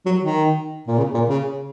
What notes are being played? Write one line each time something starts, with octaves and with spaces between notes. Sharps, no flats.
F#3
D#3
A#2
C#3
A#2
C#3